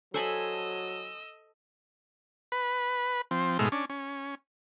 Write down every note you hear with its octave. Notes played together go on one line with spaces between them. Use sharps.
F#3 A4 C5 D#5 G#5 B5 E6
B4
F3 C4
G#2 B2 G#3 A3 E6 F6
C#4 D4
C#4